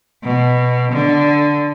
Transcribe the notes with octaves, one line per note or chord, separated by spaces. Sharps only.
B2
D3